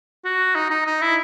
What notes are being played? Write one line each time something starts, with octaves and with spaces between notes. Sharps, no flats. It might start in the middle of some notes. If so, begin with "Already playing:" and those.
F#4
D#4
D#4
D#4
E4